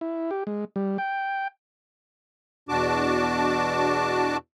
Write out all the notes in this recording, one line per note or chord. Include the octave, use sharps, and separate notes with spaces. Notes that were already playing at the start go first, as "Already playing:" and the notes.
E4
G4
G#3
G3
G5
E2 B2 D4 F#4 A5 D6